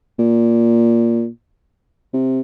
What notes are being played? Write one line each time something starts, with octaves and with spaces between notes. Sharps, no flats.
A#2
C3